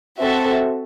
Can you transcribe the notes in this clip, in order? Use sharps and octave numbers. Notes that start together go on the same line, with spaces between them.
C4 F#4 A4 E5